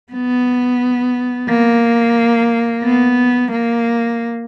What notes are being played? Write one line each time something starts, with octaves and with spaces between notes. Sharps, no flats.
B3
A#3
B3
A#3